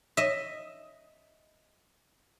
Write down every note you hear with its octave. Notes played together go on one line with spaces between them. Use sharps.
D#5 E5